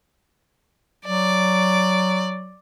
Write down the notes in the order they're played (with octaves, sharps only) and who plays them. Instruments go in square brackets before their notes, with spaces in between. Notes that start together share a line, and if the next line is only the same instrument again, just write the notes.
[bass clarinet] F#3 [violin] D5